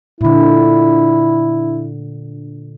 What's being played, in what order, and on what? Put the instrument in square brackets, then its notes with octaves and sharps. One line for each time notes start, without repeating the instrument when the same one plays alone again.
[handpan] A#2 D3 [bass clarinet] E4